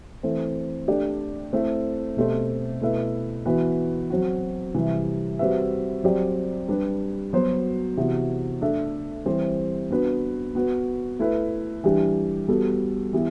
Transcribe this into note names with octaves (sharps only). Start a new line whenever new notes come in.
E3 A3 C4
A3 D4 G4 D5
A3 C4 E4 A4 E5
B2 A3 C4 G4 C5
B2 A3 E4 B4 E5
E3 B3 F#4 B4
F#3 C4 F#4
C3 E3 G3
G3 C4 F#4 B4 E5
F#3 C4 G4 D5
G3 D4 G4 B4
F#3 B3 F#4 C5
C3 E3 B3 F#4
A3 D4 A4 E5
E3 G3 C4 G4 C5
B3 D4 F#4 B4
B3 F#4 B4
A3 E4 B4
E3 G3 D4 G4
G3 B3 F#4 A4
E3 B3 E4 G4